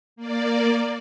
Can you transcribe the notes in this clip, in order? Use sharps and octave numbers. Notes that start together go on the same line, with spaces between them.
A#3 D5